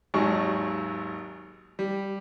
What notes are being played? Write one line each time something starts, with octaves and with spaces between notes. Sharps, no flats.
G#1 D#2 F#3 G#3 C#6
G3